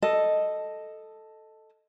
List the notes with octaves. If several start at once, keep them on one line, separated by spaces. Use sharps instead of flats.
A4 D#5